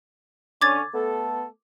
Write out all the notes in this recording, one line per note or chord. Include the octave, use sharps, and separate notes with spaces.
D3 C#4 D6 G#6 A6
A3 B3 A4